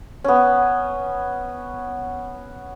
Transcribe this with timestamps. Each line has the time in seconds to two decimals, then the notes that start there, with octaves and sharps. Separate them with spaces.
0.24 B3 C#4